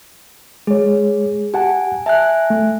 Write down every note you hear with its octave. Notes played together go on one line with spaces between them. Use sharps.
G#3 G#4 C#5
G4 F#5 G#5 A5
E5 G#5 A5 F#6
A3